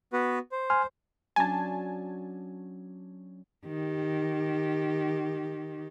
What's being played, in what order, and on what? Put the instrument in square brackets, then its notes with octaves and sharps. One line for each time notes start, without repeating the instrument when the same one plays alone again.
[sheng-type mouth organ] B3 F#4 B4
C5
[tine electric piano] G#5 C6 F6
[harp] F#3 C#4 D4 [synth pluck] G#5 A5
[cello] D#3 G4